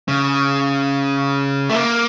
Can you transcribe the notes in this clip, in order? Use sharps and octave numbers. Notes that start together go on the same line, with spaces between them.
C#3
A3
A#3